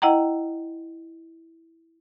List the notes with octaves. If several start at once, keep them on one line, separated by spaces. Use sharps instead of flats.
E4 D#5 F#5 G5 A#5